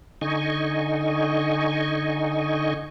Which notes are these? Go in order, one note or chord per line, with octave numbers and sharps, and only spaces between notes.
D3 D#4 D#5 G#5 C#6